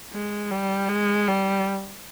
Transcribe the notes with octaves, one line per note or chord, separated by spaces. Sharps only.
G#3
G3
G#3
G3